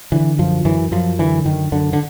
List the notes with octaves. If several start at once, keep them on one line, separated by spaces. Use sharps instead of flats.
D3 E3
F#2 F3
F#2 E3
F#2 F3
D3 E3
F#2 D#3
F#2 D3
D3